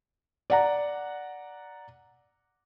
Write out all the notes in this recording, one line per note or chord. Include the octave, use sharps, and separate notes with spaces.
D5 F#5 A#5